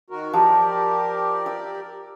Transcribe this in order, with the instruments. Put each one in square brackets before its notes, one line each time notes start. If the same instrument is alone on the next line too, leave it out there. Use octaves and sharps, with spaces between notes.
[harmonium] D#3 F#4 A#4
[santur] F3 [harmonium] G4 A#4 D5
[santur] E6